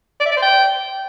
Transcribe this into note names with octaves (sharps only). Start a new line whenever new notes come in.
D5
E5
D5
C5
G5